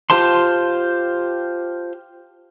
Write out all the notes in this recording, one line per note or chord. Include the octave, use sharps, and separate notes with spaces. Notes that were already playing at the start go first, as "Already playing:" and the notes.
F4 G4 C5 A5 C6